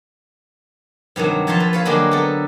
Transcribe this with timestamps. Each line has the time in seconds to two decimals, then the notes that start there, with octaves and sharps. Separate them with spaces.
1.16 G2 C3 D#3 F#3
1.47 F3 C#5 E5 A5 A#5 C6
1.60 B4
1.73 B4 C#5 F5
1.85 D3 F#3 G#3 A#3 D4 G4
2.11 B3 A4